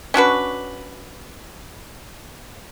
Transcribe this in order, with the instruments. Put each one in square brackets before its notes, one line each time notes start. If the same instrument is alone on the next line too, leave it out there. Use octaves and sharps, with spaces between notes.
[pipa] C#4 D4 F#4 B4